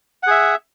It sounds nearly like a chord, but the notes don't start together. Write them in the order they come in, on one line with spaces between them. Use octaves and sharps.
F#5 G#4 E5